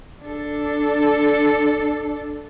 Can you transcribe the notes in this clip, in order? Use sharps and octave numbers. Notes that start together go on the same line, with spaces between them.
D4 A4